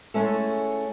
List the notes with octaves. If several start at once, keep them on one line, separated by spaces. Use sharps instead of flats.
G#3 A3 C#4 E4 A4